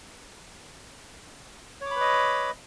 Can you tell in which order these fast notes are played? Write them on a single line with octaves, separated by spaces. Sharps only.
C#5 D6 B5 B4 D#5